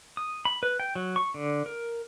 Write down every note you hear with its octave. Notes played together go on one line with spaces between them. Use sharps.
D#6
B5
B4
G5
F#3
C#6
D3
A#4